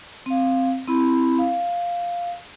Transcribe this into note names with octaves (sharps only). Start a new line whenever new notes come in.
C4 F5
C4 E4 B5
F5